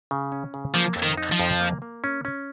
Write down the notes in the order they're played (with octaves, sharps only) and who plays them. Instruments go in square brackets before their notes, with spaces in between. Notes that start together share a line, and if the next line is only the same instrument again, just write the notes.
[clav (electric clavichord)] C#3
C#4
C#3
[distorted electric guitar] F3 [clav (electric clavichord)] A#3
[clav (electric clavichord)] F2
[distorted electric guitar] D#3
[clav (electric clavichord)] D#4
[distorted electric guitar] F3
[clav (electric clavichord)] F2
A#3
A#3
C#4
C#4